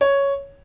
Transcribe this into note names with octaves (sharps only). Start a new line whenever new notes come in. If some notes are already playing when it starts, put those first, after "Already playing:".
C#5